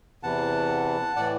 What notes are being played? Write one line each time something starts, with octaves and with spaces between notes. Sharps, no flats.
E2 C3 E3 F#5 A5
A2 E3 D5 F#5